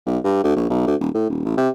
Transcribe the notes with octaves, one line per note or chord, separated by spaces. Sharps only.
B1
G2
D2
A#1
B1
D2
D#1
A2
D#1
A1
C3